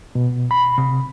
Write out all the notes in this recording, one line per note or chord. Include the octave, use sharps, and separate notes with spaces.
B2
B5
C3